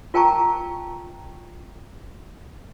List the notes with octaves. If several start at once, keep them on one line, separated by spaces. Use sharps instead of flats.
F4 A#4 G5 A5 A#5 C#6